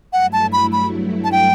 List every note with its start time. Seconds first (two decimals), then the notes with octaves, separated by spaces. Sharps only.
0.13 G2 F#3 A3 E4 F#5
0.33 A5
0.53 B5
0.73 B5
1.24 A5
1.32 G5